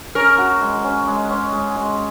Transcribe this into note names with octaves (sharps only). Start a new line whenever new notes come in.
C#4 A#4
F#4
G#3
C#4
G#3
C#4
G#3
G#3